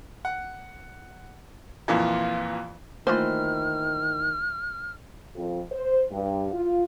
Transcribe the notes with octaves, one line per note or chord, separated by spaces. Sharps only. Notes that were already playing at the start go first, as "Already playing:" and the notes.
F#5
F2 A#2 E3 F4
D#3 E3 A3 A#3 F4 C5 F6
F2
C5
G2
F4